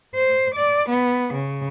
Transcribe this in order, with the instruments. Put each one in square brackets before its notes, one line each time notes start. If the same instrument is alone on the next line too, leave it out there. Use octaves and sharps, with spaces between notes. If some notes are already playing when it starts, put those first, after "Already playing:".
[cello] C5
D5
B3
C#3